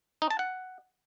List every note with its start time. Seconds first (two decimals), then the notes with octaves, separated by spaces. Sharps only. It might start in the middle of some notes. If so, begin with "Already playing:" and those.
0.22 D#4
0.30 A5
0.39 F#5